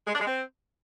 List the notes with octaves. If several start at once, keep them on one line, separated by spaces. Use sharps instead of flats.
G#3
D4
G#3
C4